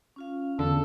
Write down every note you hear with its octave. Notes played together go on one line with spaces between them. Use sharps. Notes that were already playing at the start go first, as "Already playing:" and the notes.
C#4 F4 F5
E2 D3 A4